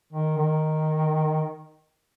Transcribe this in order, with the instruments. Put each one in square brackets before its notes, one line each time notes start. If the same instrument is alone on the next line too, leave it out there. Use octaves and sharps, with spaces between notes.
[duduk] D#3
D#3